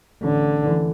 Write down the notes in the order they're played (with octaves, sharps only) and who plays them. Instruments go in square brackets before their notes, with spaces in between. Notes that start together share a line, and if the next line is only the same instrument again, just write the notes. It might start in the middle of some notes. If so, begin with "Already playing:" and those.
[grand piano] A1 [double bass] D3
[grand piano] E3 A3 D4